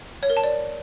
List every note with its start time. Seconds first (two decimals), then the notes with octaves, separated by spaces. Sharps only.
0.23 C#5
0.30 A#4
0.37 A5
0.44 D5